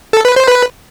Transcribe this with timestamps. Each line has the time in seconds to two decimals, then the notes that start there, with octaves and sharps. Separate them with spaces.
0.13 A4
0.25 B4
0.36 C5
0.48 B4